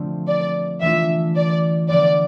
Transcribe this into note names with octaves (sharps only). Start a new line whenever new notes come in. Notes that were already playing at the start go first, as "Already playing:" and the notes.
Already playing: D3 F3 A3 C4
D5
E3 A3 D4 F4 E5
D5
D3 F3 B3 D5